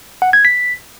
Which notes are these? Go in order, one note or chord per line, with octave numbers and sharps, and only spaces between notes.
F#5
G#6
B6